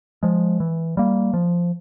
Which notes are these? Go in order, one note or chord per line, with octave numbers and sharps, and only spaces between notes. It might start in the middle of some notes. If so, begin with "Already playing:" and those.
F3 G#3
E3
G3 A#3
F3